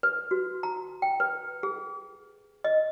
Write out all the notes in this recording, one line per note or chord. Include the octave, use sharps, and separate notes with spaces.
B4
F#4
A#5
G5
B4
G#4
D#5